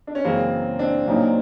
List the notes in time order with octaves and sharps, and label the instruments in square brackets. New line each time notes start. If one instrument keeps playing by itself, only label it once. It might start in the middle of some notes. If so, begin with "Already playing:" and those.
[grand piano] D4
C#4
[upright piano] F#2 C#3 E3 G#3 [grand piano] A#3 C4
[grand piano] C4 D4
[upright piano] A#1 A#2 F#3 A#3 D#4